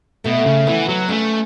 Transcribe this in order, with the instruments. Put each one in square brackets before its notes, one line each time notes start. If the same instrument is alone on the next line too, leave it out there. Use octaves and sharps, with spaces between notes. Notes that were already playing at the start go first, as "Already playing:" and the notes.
[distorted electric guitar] B2 [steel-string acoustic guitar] A3
[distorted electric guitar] C#3
[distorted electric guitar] E3 [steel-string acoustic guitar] B3
[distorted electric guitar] F#3
[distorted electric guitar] A3 [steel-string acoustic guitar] C#4